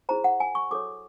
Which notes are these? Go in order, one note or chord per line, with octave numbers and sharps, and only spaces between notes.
E4 G#4 C5 A#5
F#5
G#5
C#6
F#4 A4 C#5 D6